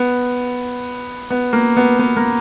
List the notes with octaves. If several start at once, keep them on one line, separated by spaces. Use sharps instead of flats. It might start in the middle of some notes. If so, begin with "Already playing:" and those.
Already playing: B3
B3
A#3
B3
B3
A#3